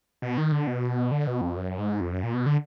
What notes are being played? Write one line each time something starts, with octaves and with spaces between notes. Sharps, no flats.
B2
D#3
D3
B2
D3
B2
F2
F#2
G#2
F2
F#2
A#2
B2
D3